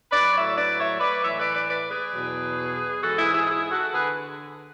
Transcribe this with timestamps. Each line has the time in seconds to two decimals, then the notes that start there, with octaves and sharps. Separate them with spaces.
0.11 B4 D5
0.33 A2 F#3 C#5 E5
0.56 B4 D5
0.78 C#5 E5
1.00 B4 D5
1.23 A2 E3 C#5 E5
1.38 B4 D5
1.53 B4 D5
1.68 B4 D5
1.90 G#4 B4
2.13 E2 B2 F#3
3.03 G#2 E3 F#4 A4
3.17 E4 G#4
3.33 E4 G#4
3.47 E4 G#4
3.70 F#4 A4
3.93 D3 G#4 B4